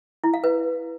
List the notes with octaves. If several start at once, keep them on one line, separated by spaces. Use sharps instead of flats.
E4
F5
B4